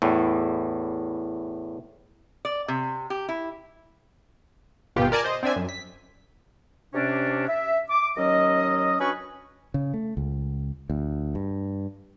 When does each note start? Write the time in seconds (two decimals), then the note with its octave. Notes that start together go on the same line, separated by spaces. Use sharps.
0.02 E2 A2
2.45 D5
2.68 C3
3.10 G4
3.29 E4
4.96 G#1 B2 B3 F4 G4
5.12 A#4 D5 G#5 A5
5.24 C5 D#5
5.43 C4 D4 E5 G#5
5.56 F#2
5.69 B6
6.94 C3 C#4 D4
7.48 E5
7.90 D6
8.17 D#2 F#3 C#4 D#5
9.00 C#4 D4 F#4 B4 G#5 C#6
9.74 C#3
9.94 A3
10.17 C#2
10.90 D2
11.35 G2